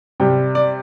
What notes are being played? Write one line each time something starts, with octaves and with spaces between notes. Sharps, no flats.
C3 G3 G5
D5